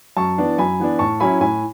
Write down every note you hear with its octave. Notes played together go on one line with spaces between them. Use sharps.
F#2 A5 C#6
E3 B3 D4
F#2 G#5 B5
E3 B3 D4
A2 A5 C#6
F#3 C#4 E4 G#5 B5
A2 G#5 B5